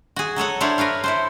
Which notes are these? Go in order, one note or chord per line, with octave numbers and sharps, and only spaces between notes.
F#4 G#4
F#3 A4 C#5 F#5
D4 E4 C5 C#5 F5
A#4 B4 C#5 F5
E4 A4 C5